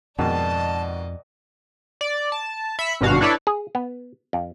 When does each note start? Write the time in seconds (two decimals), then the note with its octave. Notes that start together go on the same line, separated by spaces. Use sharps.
0.19 F2 G#2 B2 D#3 D5 D#5 A5
2.01 D5
2.32 A5
2.79 E5 B5 B6 C#7
3.01 G#1 G2 B2 F#4 F5
3.21 D4 E4 A4 B4 C#5 D5
3.47 G#4
3.75 B3
4.33 F2